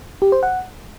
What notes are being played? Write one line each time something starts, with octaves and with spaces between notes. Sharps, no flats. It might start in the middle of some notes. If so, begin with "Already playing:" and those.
G4
C5
F#5